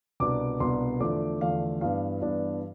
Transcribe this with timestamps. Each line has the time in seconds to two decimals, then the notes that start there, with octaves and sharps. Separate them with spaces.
0.20 C2 B2 B3 D4 D6
0.60 C2 B2 B3 D4 C6
1.00 E2 D3 F3 A3 D4 D6
1.41 E2 D3 F3 A3 D4 F5
1.81 G2 E3 B3 D4 F5
2.22 G2 E3 B3 D4